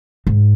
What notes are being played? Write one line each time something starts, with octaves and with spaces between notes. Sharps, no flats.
G#2